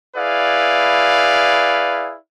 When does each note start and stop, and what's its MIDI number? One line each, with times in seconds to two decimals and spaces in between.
0.16 2.16 64
0.16 2.16 68
0.16 2.16 71
0.16 2.16 74
0.16 2.16 77